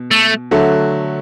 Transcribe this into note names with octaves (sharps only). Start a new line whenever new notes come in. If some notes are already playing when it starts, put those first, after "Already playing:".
Already playing: B2
A3
D3 F#3 A3